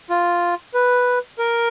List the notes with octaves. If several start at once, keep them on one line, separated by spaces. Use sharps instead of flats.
F4
B4
A#4